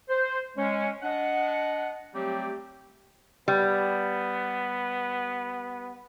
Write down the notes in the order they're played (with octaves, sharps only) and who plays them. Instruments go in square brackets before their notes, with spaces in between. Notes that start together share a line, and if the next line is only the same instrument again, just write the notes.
[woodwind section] C5
G#3 C#4
D4 D#5 F#5
F#3 G3 A3 C4 G4
[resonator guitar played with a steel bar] G3 [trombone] B3